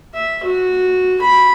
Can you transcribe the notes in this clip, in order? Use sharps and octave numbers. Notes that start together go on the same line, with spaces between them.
E5
F#4
B5